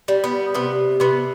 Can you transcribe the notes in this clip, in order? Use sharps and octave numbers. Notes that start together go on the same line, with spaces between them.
G3
B3
C3 B3
C3 B3